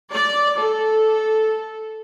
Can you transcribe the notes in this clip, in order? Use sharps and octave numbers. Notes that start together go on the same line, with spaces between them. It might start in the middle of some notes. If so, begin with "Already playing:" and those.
D5
A4